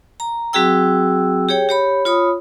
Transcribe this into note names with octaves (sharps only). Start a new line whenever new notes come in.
A#5
F#3 C4 F#4 G#4 G5 E6
G4 G#4 C#5 G5
G4 C#5 B5
F4 C#5 B5 D#6